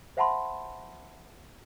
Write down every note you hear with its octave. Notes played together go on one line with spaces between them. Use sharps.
C5 E5 F#5 A5 B5 C6